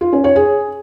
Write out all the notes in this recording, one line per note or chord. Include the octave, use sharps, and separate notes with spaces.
F4
C#4
C#5
G#4